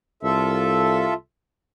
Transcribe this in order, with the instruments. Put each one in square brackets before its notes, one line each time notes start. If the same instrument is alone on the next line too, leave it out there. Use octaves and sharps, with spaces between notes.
[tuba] C2 [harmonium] F4 A4 E5